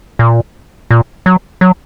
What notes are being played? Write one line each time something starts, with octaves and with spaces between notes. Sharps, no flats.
A#2
A#2
F#3
F#3